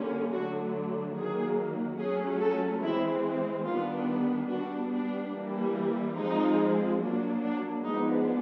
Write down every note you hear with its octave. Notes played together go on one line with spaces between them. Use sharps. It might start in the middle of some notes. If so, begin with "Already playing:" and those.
Already playing: D3 G3 A#3 C#4
D3 F#3 A3 D4 F#4
D#3 F#3 A#3 G#4
F#3 A3 C#4 G#4
A4
E3 G#3 C4 E4
D#3 G3 B3 D4 F4
G3 B3 D4 F#4
D4
E3 G3 A#3
F3 G#3 C4 D#4
F#3 A#3 D4
D4
F3 G#3 B3 D4 D#4